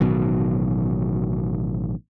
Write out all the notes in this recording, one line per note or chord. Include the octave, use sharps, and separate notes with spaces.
A1 B2 D#3 F#3